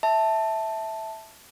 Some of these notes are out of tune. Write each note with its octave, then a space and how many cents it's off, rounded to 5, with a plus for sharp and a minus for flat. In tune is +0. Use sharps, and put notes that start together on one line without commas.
E5 -10 A5 +0